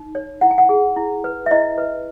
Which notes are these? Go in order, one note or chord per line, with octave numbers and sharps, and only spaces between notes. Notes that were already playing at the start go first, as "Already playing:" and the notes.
Already playing: D#4
C#5
E4 F#5
G#5
F#5
G#4
E4
B4
E5
E4 D#5
B4